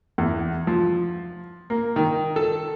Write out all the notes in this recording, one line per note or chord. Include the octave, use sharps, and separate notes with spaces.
E2
F3
A#3
D#3
A4